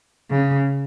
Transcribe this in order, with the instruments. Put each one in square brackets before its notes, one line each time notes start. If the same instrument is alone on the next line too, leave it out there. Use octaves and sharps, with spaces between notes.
[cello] C#3